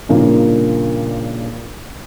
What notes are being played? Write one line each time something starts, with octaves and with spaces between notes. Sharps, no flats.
G2 A#2 C#3 F3 A#3 D#4